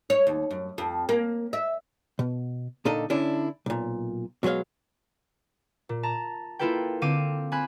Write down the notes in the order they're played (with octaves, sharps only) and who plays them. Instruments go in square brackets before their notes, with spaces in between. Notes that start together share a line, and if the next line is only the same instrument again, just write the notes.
[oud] C#5
D#2
F#2
F2
A#3
E5
[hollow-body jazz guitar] B2
A#2 D3 A#3 D#4 A4 D#5
D3 C#4 D4 E4
B1 A#2
B2 F#3 G#3 C#5 F5
[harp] A#2
A5 A#5
A#3 E4 F4 A4 B4 G5
D3 C4 F5 D6 D#7
C4 G#5 B5 F#6